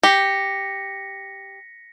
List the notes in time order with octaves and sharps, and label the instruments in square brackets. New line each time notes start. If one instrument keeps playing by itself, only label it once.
[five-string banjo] G4 [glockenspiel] A#6 B6 C#7